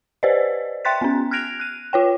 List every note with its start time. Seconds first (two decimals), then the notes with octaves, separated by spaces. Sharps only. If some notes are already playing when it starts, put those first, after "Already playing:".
0.23 G4 B4 C5 D5 D#5
0.85 E5 G5 C6 F#6 A6 B6
1.01 B3 C#4
1.31 F6 F#6 G#6 A#6 D7 F7
1.60 F#6 D#7
1.93 F4 C#5 G5